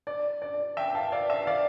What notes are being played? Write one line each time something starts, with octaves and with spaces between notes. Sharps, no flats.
D5
D5
E5 G5
F5 A5
D5 F5
E5
D5 F5